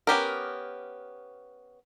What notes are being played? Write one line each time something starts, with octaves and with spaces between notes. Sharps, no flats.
B3 C#4 G4 A#4